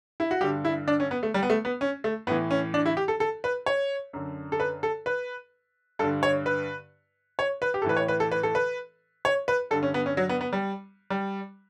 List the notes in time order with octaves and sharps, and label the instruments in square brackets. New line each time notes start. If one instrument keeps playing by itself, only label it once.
[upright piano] E4
F#4
G2 D3 G4
E4
D4
C#4
B3
A3
G3
B3
A3
B3
C#4
A3
A2 B3
E3
C#4
D4
E4
G4
A4
A4
B4
C#5
F#2 D3
A4
B4
A4
B4
G2 A4
D3
C#5
B4
C#5
B4
G4
A4
A2 E3 B4
C#5
B4
A4
B4
A4
B4
C#5
B4
G2 D3 A4
C#4
B3
C#4
F#3
B3
B3
G3
G3